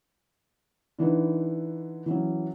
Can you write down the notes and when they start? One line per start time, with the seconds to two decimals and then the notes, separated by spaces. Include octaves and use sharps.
0.99 D3 E3 D#4 B4
2.06 E3 F#3 C#4